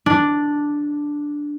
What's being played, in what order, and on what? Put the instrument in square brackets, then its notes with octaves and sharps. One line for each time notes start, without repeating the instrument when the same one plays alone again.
[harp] D4